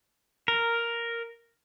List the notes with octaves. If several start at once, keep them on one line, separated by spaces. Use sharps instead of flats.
A#4